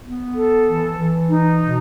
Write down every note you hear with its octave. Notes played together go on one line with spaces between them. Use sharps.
B3
A4
E3
E3
D#4
B2